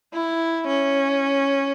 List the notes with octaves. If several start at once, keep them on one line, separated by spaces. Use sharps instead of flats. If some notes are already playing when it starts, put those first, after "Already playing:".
E4
C#4